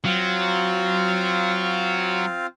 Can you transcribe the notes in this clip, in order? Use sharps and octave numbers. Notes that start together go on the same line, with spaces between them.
F#3 C4 F4 F5